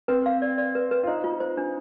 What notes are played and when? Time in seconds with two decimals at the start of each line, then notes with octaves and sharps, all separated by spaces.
0.08 C4 B4
0.26 F5
0.42 D5
0.58 D5
0.75 B4
0.91 B4
1.03 F4
1.07 D#4 C5
1.24 F4
1.40 C5
1.57 D4